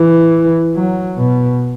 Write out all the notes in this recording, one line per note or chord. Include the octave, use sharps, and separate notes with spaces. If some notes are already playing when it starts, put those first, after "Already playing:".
Already playing: E3
F#3
B2